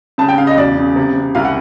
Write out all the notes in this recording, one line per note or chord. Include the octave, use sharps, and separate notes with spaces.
C#3 A5
G5
C#3 F5
D#5
E1 D5
C#3
C3
C3
C2 F5
F#5